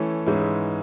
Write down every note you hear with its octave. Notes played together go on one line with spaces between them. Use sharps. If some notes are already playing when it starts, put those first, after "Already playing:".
Already playing: E3 A3 C#4 E4
G#2 E3 G#3 C#4 E4